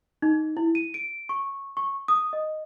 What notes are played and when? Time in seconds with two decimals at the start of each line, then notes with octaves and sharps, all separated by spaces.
0.22 D#4
0.57 E4
0.75 D#7
0.94 D7
1.29 C#6
1.77 C#6
2.08 D#6
2.33 D#5